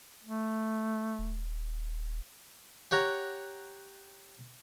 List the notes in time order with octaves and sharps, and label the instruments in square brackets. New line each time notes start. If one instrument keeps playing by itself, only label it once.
[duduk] A3
[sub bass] D#1
[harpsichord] G4 C#5 F#5 A#5